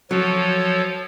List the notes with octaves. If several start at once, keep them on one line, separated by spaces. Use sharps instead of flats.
F3 F#3 A4 C#5